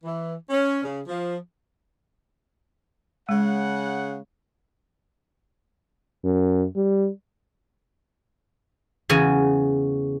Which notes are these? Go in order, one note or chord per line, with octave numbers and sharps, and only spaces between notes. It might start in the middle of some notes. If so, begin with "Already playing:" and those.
E3
C#4
C#3
F3
C#3 G#3 F#5
F#2
G3
E2 C#3 F#4 G#5